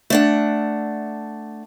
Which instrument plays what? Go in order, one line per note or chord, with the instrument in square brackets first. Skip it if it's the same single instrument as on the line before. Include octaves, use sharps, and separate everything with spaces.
[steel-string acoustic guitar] A3 D4 F#5